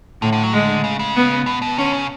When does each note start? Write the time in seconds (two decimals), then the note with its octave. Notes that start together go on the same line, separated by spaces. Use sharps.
0.22 A2 D3
0.32 D3
0.43 F#3
0.53 D3 G#3
0.84 C#3
0.99 C#3
1.16 B3
1.46 B2
1.62 B2
1.78 D3 C#4
1.93 C#3